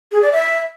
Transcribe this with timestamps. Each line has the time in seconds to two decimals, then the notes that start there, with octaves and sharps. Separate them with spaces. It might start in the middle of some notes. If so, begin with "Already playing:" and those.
0.12 G#4
0.22 D5
0.32 E5